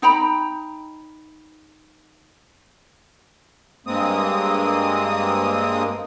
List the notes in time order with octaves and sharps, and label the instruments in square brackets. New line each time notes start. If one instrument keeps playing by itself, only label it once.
[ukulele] D#4 G5 A#5 B5
[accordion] G2 G#3 A#3 C4 D#6